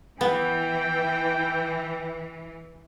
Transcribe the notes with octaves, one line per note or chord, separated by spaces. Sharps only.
E3 B3 G5